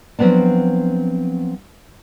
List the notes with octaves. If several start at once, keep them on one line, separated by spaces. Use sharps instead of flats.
F3 F#3 A3 B3 C4 D4